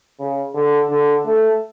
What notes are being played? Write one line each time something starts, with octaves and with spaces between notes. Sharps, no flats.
C#3
D3
D3
A3